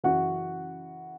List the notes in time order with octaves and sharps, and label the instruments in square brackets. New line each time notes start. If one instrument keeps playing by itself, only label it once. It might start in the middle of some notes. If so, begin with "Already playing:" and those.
[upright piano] F#2 C#3 E3 F#4 F#5